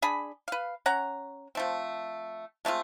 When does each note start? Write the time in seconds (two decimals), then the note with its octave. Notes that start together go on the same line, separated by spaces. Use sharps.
0.02 D4 G#4 B5
0.48 B4 F5
0.86 C#4 F#5 A#5
1.55 F3 A3 C4
2.65 G#3 A3 C4 F4